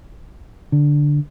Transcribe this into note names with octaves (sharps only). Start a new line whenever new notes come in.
D3